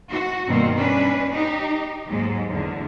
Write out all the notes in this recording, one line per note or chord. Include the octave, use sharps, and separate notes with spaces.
F#4
G2 B2 D#3 G3 A#3 C4
C#4 D4 B4
D#4 G4
D#2 G#2 F#3 G#3
E2 D3